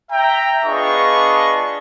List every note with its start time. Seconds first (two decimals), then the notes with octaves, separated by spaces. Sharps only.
0.11 E5 G5 A#5
0.65 B3 D4 F4 G#4 D#5 C#6